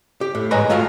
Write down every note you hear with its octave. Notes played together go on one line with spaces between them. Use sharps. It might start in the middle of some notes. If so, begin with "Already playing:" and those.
G4
A2
G#2 B4 C#5 D#5 G#5 A#5
G#3 A3 F4 F#4 E5 F5